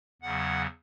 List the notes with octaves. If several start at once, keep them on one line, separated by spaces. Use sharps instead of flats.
E2 C#3 F#3 F#5